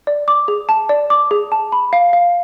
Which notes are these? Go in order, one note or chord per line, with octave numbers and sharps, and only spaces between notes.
D5
D6
G#4
A5
D5
D6
G#4
A5
B5
F5
F5